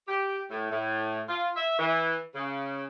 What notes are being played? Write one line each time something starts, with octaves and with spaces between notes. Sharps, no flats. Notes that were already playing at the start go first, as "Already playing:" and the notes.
G4
A2
A2
F4
E5
E3
C#3